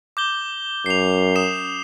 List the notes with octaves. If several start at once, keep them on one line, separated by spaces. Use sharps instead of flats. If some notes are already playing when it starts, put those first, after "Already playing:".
D6 G6 G7
F#2 C7 F7
D#6 C7 E7